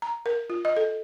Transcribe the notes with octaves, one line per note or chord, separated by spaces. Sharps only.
A#5
A#4
F4
D#5
A4